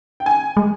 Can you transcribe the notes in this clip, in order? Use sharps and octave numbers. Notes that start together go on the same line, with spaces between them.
G5
G#5
G#3